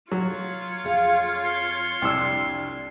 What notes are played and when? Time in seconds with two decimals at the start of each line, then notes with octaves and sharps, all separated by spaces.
0.12 F#3 F4 C#5
0.84 F2 G#4 F5
1.45 C6
2.02 C2 F2 C4 D4 E6